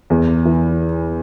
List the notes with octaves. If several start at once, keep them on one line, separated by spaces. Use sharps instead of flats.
E2
E3